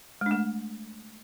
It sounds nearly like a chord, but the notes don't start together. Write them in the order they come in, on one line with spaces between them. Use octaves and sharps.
G#3 D4 A3